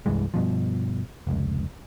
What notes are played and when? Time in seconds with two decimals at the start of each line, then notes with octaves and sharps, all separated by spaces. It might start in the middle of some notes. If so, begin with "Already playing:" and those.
0.06 C2 G2 E3 G#3
0.34 G2 B2 F3
1.27 F1 C#2